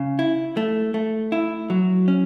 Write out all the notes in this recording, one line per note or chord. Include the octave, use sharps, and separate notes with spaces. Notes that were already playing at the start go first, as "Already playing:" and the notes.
Already playing: C#3
E4
A3
A3
E4
F#3
C#4